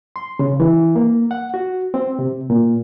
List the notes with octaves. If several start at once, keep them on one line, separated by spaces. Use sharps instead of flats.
C6
C#3
E3
A#3
F#5
F#4
C4
C3
A#2